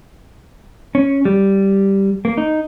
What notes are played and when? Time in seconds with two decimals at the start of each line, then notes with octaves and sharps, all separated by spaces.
0.95 C#4
1.25 G3
2.25 A#3
2.38 D#4